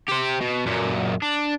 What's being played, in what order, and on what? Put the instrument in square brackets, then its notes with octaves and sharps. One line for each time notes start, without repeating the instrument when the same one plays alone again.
[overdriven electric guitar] G4 C5
B2
F#2 A#2
D4